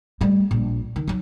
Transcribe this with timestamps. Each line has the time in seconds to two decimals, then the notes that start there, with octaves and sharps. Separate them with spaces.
0.21 G3 A3
0.51 A#1
0.96 D#3
1.08 F#3 D#4